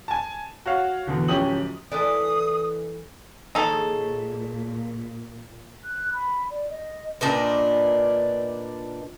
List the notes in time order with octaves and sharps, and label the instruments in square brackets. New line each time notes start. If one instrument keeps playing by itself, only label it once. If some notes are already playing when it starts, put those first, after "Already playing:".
[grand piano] G#5 A5
F#4 C#5 F5
E2 B2 D3
D1 F3 C#4 G4 D#6 F#7
[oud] E3 A4 D#5 [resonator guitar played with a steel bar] B4 D5 [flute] D#6
[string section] A#2 [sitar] D#3 G#4 C#5 [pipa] D#4 A4
[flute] F#6
B5
D5
D#5
[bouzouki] A#2 D4 D#4 B4